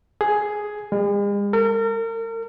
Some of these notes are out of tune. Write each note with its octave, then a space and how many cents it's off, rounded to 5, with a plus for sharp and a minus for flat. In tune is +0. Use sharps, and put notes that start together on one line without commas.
G#4 +10
G#3 -45
A#4 -40